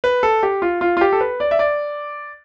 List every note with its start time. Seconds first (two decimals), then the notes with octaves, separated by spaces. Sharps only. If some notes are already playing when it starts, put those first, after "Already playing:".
0.04 B4
0.23 A4
0.43 G4
0.62 F4
0.81 F4
0.97 F4
1.01 G4
1.13 A4
1.21 B4
1.40 D5
1.51 E5
1.59 D5